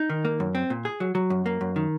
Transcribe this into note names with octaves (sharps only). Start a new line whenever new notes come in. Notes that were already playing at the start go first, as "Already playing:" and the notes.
Already playing: D#4
D#3
A#3
F#2
C4
A#2
G#4
F#3
F#3
F#2
A#3
F#2
D#3